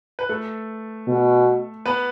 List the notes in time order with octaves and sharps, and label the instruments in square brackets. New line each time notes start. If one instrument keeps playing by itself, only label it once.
[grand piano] B4
A3 A4
[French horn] B2
[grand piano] B3 B4